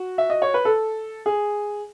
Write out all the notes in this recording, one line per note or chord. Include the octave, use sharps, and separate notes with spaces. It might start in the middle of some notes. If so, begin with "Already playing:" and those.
Already playing: F#4
E5
D#5
C#5
B4
A4
G#4